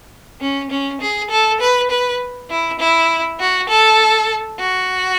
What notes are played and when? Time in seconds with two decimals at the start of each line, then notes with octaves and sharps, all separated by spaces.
0.41 C#4
0.70 C#4
1.01 G#4
1.30 A4
1.60 B4
1.91 B4
2.50 E4
2.79 E4
3.40 F#4
3.69 A4
4.59 F#4